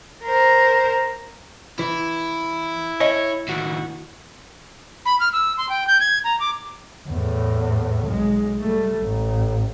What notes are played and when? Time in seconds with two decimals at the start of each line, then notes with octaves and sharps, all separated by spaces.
0.24 A#4 C5
1.79 E3 E4
3.00 C#5 D#5 E5 G#5
3.49 D#2 A2 F#4
5.06 B5
5.20 F6
5.33 E6
5.58 C6
5.69 G5
5.87 G6
6.00 G#6
6.24 A#5
6.40 D6
7.08 E2 A2
8.08 B1 G#3
8.60 G3 A3
8.99 A1